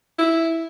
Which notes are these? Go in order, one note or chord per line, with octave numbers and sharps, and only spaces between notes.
E4